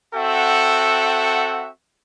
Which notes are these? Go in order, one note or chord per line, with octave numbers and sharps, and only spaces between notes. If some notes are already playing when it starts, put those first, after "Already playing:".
C4 F#4 A4 E5 F#5 G5